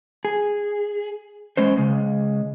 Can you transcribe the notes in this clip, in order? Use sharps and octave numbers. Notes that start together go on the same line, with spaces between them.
G#4
E2 G#3 C#4 C5
C#3 G#3